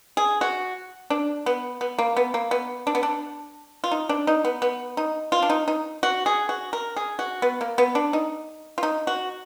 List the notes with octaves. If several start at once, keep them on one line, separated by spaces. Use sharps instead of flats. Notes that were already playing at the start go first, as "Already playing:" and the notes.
G#4
F#4
D4
B3
B3
A#3
B3
A#3
B3
D4
B3
D4
F4
D#4
D4
D#4
B3
B3
D#4
F4
D4
D#4
D#4
F#4
G#4
F#4
A#4
G#4
F#4
B3
A#3
B3
D4
D#4
F4
D#4
F#4